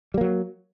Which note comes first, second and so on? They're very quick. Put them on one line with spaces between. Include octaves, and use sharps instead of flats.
G3 A#3 F#3